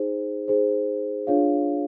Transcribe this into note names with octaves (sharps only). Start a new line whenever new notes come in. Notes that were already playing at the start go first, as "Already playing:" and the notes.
Already playing: D#4 G#4 C5
D#4 G#4 C5
D4 F4 G#4 C#5 F5